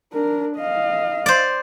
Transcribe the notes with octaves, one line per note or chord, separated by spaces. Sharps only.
D4 A#4
D#5 F5
C5 D5